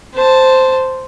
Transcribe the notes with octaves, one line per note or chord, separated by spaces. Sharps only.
C5 A5